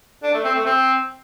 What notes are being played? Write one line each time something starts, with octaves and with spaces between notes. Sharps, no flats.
D4
A3
C4
A3
C4